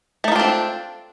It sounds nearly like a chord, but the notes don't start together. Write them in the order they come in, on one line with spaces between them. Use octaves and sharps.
A3 D#4 F4 D4 C4